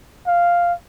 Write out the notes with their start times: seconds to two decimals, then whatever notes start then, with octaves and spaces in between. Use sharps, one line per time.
0.27 F5